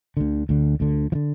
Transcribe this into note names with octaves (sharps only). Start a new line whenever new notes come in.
D2 D3
D2 D3
D2 D3
F3
D3